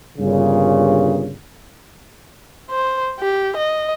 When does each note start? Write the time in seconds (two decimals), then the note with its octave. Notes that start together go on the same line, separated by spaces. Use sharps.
0.17 G1 G2 A#2 C#3
2.70 C5
3.20 G4
3.57 D#5